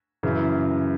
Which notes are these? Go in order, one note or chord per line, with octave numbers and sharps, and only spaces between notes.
F#2 C#3 E3